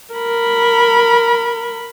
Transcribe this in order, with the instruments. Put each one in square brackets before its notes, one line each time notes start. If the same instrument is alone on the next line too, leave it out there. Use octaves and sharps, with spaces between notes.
[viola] A#4 B5